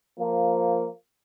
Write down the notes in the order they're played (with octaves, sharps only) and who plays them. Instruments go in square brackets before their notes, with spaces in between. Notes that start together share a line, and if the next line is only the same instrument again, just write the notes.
[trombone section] F3 A#3